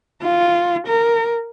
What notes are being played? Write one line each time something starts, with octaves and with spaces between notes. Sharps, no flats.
F4
A#4